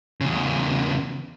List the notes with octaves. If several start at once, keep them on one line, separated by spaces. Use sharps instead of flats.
E2 C#3